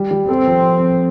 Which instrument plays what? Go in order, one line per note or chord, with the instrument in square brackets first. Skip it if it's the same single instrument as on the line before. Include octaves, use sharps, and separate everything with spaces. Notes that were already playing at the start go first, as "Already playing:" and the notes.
Already playing: [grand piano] G3
G3
[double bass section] C4 [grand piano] A4
[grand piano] F3